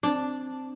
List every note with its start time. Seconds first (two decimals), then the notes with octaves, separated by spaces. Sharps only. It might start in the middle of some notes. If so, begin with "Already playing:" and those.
0.03 C4 D4